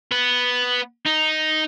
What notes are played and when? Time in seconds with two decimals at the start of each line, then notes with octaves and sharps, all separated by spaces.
0.12 B3
1.06 D#4